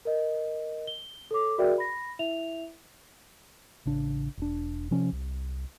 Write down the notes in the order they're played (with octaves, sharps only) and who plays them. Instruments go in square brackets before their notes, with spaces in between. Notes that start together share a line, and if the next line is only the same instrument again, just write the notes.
[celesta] A#4 D#5
G7
A4 C#5 D6
F#4 G#4 A#4 D5 E5 G5
B5 A#6
E4 E5 F7
[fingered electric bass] A1 C#3 D4
E1 D4
C3 F3 C#4
C2